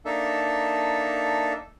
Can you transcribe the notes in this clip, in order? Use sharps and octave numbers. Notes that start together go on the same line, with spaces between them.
A#3 D4 D#4 A4 E5